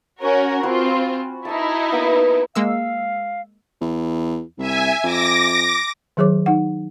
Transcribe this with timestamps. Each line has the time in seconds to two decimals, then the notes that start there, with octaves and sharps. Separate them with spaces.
0.21 C#4 F#4 A#4
0.63 C4 F4 F#4 G#5 B5
1.45 D#4 E4 E5 A5
1.92 A#3 B3 A#5
2.55 G#3 A#3 F5 E6
3.81 E2
4.58 C2 E5 G#5
5.03 F2 D6 A#6
6.17 D#3 F#3 G#4 C#5 D6
6.46 D#4 F#5